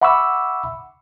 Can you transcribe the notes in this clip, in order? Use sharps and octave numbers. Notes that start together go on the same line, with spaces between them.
E5 F#5 B5 C#6 D6 E6